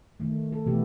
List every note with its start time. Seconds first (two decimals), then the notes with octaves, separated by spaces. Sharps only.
0.20 D#3 A3
0.52 A4
0.66 B2 E3 A3 B3 G4